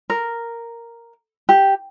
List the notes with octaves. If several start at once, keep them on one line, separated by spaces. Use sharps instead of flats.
A#4
G4